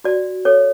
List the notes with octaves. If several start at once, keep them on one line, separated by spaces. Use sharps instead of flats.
F#4 D5
A4 C#5